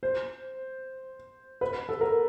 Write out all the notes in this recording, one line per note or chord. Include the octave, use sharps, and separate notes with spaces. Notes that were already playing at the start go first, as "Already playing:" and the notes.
C5
B4
A4
A#4